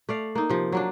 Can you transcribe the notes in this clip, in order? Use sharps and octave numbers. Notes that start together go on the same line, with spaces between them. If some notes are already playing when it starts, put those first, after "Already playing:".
A3 D5 F5
A#3 D#4
C3 F3
F#3 A#3 D4